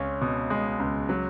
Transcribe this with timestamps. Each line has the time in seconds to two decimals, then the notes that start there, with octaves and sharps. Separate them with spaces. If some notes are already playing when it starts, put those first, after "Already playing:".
Already playing: C#2 C#4
0.21 B2
0.50 G#3
0.79 C#2
1.09 F#3